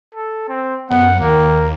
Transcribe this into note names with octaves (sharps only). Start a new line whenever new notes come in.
A4
C4
F#2 B3 F#5
D#2 D#3 A#3